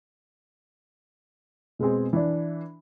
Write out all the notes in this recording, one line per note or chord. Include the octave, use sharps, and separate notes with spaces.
B2 G#3 B3 C4 G#4
E3 D4